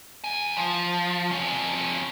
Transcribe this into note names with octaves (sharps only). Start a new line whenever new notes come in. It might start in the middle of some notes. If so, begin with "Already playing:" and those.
E2 G#5
F3
F2 C#4